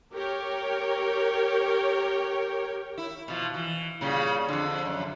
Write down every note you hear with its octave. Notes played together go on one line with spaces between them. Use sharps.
G4 A#4 C#5 G5
E4
B2 F3
E3
A#2 C#3 G3
F2 D3
F#2